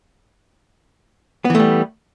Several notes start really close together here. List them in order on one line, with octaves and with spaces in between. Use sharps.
B3 E3 A3 G3